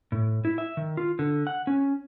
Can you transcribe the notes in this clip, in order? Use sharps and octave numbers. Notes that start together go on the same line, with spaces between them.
A2
E4
E5
D#3
F4
D3
F#5
C#4